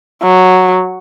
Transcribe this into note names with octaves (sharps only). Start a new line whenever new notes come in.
F#3